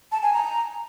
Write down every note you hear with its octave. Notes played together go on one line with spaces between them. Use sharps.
A5
G#5
A#5